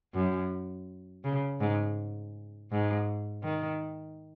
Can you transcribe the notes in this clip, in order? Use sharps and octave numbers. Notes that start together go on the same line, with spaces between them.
F#2
C#3
G#2
G#2
D#3